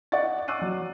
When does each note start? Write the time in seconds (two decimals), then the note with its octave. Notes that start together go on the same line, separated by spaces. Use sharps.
0.12 D5 D#5 F#5 C#6 A6
0.48 C#6 D6 E6 F#6 C7 D#7
0.61 F#3